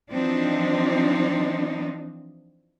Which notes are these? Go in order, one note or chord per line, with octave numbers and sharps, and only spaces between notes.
E3 F3 C4 D4 D#4